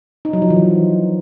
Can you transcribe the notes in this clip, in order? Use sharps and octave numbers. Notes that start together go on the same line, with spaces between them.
D#4
F#3
F3
E3